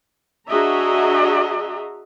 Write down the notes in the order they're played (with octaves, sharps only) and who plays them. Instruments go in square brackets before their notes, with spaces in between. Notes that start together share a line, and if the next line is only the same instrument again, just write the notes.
[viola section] D4 F#4 G#4 D#5 E5 A#5